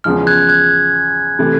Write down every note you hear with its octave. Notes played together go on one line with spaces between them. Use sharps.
E2 C#3 F3 G#3 F6
F#6 G#6
F#6 G#6
C3 E3 A3